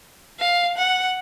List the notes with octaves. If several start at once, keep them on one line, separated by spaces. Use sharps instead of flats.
F5
F#5